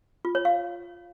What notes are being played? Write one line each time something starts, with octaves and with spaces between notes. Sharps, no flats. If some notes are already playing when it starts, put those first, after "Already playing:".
F4
C#5
F5